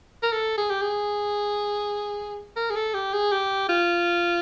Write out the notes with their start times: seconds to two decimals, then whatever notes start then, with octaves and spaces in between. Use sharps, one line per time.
0.23 A#4
0.33 A4
0.58 G#4
0.70 G4
0.81 G#4
2.56 A#4
2.71 G#4
2.76 A4
2.94 G4
3.13 G#4
3.32 G4
3.69 F4